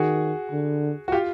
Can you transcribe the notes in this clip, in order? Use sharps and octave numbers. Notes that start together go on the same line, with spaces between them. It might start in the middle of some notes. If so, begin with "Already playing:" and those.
Already playing: D#3 F#4 G#4
D3
F#4
F4 G4